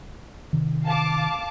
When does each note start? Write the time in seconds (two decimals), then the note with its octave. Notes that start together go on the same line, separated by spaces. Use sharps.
0.53 C3 D#3
0.85 F5 A5 D6